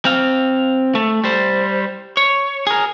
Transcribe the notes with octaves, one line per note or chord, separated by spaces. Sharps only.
C4 F5
A3
G3 C5
C#5
G#4 A#4